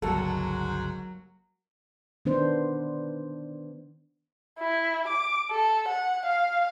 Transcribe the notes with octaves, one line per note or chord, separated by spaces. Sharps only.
G1 C#2 G#2 F#3 A#3 F#4 A4
D#3 B3 D4 C5
E4
D6
A4
F#5
F5